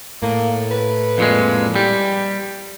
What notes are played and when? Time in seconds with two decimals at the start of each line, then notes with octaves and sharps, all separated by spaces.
0.23 A2 A#3
0.71 B4
1.18 F2 A#2 G#3
1.76 G3 G4